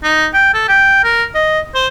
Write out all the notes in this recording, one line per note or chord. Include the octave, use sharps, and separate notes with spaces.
D#4
G5
A4
G5
A#4
D#5
C5